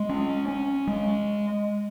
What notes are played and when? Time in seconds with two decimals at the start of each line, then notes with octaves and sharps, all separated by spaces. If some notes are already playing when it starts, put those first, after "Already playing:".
Already playing: G#3
0.09 C#4
0.48 C#4
0.87 G#3